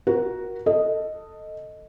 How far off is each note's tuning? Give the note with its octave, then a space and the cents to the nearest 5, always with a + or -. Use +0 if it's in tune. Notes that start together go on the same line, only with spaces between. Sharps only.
F#4 +0 A#4 +20
A4 +15 D#5 +0